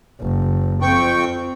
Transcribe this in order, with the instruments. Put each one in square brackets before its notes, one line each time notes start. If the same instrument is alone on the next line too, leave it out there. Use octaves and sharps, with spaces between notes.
[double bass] F#1
[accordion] F2 G5 C#6 [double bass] C4